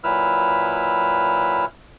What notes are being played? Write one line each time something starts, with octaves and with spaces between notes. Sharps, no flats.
A#2 F#3 E4 B4 E6 F6